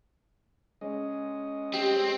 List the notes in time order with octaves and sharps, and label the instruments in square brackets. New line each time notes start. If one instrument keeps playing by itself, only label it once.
[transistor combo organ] G#3 C#4 D#5
[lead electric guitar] C4 [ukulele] G4